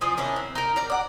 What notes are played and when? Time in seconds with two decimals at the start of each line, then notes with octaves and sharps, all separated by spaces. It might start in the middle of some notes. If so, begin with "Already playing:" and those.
0.01 F3 C4 G#4 D5
0.17 D#3 C#4 D4 E4
0.36 C4
0.55 D#4 A#4
0.76 A#4 D5 A#5
0.90 D5 F#5